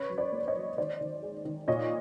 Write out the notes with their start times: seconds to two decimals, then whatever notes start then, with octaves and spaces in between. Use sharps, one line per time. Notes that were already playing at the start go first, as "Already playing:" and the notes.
Already playing: C#3 B4 C#5
0.10 F#3
0.18 C5 D5
0.32 A#3
0.48 C#5 D#5
0.55 F#3
0.77 D#3 C5 D5
1.01 D#3
1.23 G#3
1.45 D#3
1.68 A#2 C#5 D#5